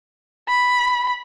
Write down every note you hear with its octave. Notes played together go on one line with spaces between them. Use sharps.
B5